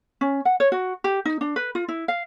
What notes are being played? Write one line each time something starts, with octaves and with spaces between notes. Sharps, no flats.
C#4
F#5
C#5
F#4
G4
D#4
D4
B4
F4
E4
F5